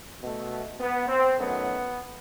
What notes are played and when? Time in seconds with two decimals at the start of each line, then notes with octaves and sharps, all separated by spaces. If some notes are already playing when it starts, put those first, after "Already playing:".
0.22 B2 A3
0.80 B3
1.08 C4
1.37 F#2 D#3 F#3 A3 B3